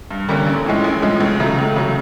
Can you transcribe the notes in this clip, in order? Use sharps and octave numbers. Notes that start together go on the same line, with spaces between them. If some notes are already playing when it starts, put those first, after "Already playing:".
G2
D3 G3 A#3 C#4
A1
A2 F3 G#3 C#4
A1
A2 F3 G#3 C#4
C#2
C#3 F#3 A3
C#2
C#3 F#3 A3